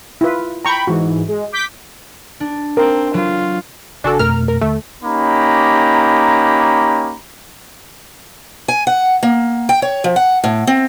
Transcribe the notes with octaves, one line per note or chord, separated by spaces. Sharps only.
E4 F4 B4
G5 A#5 B5 C#6
G#2 E3 F#4
G#3
D6 G6 B6
D4
C4 A#4
F#3 F4
G#1 C#3 D4 F#4 A4 G#5
F2 B2 A3 A#4 F6
A#4
D#2 D3 A3
A#3 C#4 D#4 G4 A#5 B5
G#5
F#5
A#3
G5
C#5
F3
F#5
A2
C4